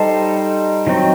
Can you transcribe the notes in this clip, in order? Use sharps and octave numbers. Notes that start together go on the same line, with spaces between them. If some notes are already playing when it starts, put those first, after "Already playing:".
Already playing: G3 D#4 A4 C5
D#3 F#3 C4